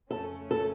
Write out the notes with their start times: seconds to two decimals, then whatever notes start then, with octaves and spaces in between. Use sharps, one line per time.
0.11 F2 C#3 A3 C#4 A4
0.51 A4